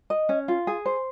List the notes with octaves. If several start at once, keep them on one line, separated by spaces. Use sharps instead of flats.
D#5
C#4
F4
G#4
C5